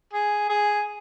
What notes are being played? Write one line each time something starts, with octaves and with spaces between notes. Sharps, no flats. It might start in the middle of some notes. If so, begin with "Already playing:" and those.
G#4
G#4